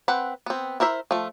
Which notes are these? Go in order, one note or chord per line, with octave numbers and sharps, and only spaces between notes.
C4 B4 F#5
B3 C4
E4 A#4 C5 E5
F3 A3